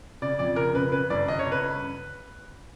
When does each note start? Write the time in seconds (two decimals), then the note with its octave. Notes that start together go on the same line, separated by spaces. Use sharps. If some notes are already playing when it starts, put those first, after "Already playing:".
0.22 C#3 D5
0.39 F2 D5
0.56 C#3 A#4
0.75 C#3 B4
0.92 C#3 B4
1.10 G1 D5
1.28 G1 D#5
1.39 C#5
1.46 C#3
1.52 B4